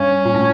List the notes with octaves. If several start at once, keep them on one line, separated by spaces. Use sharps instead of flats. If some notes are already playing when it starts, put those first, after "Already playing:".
Already playing: G2 C#4
A#2
A2